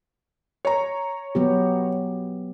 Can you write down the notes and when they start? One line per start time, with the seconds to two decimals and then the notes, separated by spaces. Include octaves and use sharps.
0.65 C#5 A#5
1.35 F#3 B3 G4